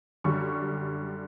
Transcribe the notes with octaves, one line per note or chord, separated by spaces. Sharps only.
F#2 D3 G3 C#6